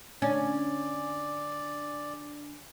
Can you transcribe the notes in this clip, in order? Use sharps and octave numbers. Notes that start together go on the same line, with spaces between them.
D3 C#4 D4 D5 G#5